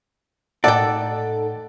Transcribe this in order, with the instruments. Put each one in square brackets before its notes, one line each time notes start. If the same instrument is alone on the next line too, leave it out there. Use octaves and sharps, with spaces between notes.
[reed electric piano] A2 F#5 [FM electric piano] D#4 A4 [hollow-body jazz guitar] D5 G5